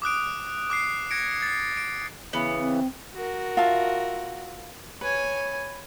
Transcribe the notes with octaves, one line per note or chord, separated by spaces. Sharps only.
D6 D#6 F#6 D7
D6 F#6 C7
G#6 A#6 C#7 D7
A6 C7
D7
C#3 E3 B3
C4
F#4 A#4
F4 E5 A5
B4 C#5 G#5